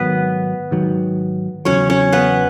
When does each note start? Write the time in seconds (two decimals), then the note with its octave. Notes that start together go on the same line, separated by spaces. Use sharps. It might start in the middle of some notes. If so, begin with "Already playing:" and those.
Already playing: G#2 D#3 F#3 B3 B4
0.71 G#2 D#3 F#3
1.65 E2 C#3 F#3 C#4 C#5
1.90 C#4 C#5
2.12 B3 B4